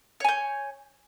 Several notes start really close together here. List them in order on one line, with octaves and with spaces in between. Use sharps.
C#5 G#5 G6